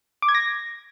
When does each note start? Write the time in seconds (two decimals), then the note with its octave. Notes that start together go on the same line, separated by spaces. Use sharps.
0.22 D6
0.29 G#6
0.35 A#6